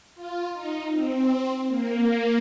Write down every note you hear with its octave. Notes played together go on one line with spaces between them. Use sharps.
F4
D#4
C4
A#3